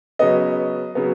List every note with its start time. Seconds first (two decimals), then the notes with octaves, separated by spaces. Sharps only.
0.19 C#3 F#3 B3 D#5
0.95 C#3 F#3 B3